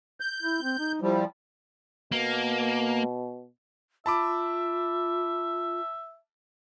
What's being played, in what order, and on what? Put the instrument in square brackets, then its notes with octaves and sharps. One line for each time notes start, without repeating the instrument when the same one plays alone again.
[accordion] G6
[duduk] E4
C4
D#4
[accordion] F3 G3 [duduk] E4
[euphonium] B2 [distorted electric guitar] A#3
[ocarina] F4 [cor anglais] E5 [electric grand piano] A5 B5 D6